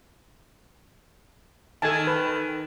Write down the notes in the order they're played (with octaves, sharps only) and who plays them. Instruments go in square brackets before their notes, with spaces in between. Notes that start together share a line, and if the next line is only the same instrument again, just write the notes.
[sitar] D#3 [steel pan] A4 G#5 A5
[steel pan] B4